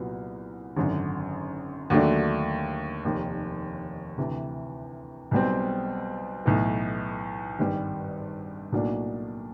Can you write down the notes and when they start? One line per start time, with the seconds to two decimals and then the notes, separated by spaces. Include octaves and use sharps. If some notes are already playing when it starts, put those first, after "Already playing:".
Already playing: C2 A#2 F#3 B3
0.77 G#1 F#2 D3
1.90 D#2 D3 F#3 A3 D4
3.05 F1 D#2 D#3
4.17 D2 C3 E3
5.31 B1 B2 G3 C4
6.45 B1 A2 E3
7.59 G#1 G2 D#3 G3
8.72 B1 A2 F#3 A#3 D4